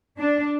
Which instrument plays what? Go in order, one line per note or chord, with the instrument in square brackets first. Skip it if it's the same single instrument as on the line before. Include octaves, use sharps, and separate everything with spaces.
[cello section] D4